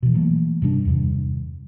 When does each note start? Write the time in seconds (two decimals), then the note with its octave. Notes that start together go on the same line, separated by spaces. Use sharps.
0.03 B2 E3
0.14 E3 F#3 A3 A#3
0.62 G2 C3 G3 D4
0.85 E2 G2 C3 D#3